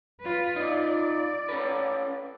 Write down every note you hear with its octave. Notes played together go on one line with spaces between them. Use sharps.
F4 B4
D#4 F4 D5
C#4 A4 B4